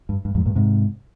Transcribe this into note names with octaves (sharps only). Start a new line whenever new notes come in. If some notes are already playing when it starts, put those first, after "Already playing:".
G2
G2
F2 G#2
G2 A#2
G#2 C3